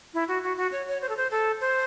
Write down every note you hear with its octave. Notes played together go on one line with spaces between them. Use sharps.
E4
F#4
F#4
F#4
C#5
C#5
C5
A4
C5
A4
C5